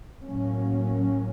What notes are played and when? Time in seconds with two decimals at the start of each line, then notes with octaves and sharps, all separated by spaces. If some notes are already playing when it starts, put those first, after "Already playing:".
0.23 A2 F#3 A#3 C#4